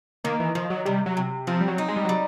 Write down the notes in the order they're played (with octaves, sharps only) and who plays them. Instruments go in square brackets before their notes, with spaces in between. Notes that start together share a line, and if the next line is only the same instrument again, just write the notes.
[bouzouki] D#3 [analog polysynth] A#3
[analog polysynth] E3
[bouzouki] D#3 [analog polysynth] F3
[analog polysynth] F#3
[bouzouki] C3 [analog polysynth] G3
[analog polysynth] F#3
[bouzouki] C3
[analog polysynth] F3 [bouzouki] C4
[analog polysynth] G3
F#3
[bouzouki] D#4
[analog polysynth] G#3
G3
F#3
[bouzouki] G3